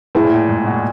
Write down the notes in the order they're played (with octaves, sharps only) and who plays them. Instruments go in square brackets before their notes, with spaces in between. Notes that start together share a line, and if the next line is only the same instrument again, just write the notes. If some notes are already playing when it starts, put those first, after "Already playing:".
[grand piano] A2 [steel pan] E4 G#4 B4
[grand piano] A#2
A2
G#2
A#2
B2
A#2